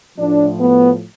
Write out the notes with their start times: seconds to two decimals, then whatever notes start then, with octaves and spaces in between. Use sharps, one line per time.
0.17 A2 F3 D4
0.60 B3